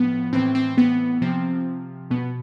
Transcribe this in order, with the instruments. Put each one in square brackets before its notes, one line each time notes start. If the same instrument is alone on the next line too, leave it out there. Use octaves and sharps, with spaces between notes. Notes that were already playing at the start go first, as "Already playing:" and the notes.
Already playing: [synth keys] A2 F3 B3
A2 E3 C4
C4
B3
C3 F3 C4
B2 B3